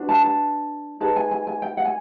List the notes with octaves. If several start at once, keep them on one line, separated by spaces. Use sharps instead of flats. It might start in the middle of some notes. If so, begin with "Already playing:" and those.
Already playing: D4 F#4 B4
A5
A5
D#4 G#4 B4 A5
G#5
G#5
G#5
G5
F#5
G#5